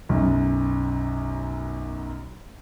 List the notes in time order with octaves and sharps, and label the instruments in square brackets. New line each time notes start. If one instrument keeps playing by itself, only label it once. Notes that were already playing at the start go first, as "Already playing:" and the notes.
[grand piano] B1 F#2